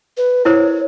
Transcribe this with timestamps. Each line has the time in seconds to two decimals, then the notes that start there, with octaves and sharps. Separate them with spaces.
0.17 B4
0.45 E4 A#4 C5 C#5